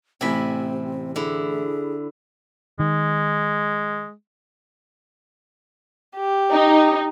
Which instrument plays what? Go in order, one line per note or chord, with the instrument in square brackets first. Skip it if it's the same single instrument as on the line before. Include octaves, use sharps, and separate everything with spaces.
[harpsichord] A1 G#5 [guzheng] C3 E4 B5 [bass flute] C4
[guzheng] D3 E4 [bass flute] G#4
[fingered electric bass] D#3 [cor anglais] G#3
[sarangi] G4
[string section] D#4